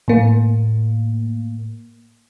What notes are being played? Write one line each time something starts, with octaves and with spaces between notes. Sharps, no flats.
A2 A#3